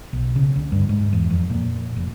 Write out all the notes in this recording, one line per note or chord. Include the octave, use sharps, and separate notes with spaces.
B1
C#3
D2
G2
G#2
E2
F2
A#2
F1